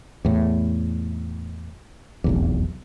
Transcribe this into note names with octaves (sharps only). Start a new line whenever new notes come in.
E2 A2
F1 B1 E2